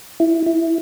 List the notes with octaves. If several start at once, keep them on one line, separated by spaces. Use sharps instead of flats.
E4
E4